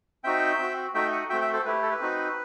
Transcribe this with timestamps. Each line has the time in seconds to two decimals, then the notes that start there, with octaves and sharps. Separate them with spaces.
0.24 C4 D#4 F#4 E5 G5
0.59 C4 F#4
0.94 A3 D#4 F#4 E5 G5
1.12 D#5 F#5
1.29 A3 C4 F#4 E5 G5
1.41 E5 G5
1.53 A4 C5
1.65 A3 E4 G4 B4
1.83 A4
1.92 B4
2.00 C4 D#4 F#4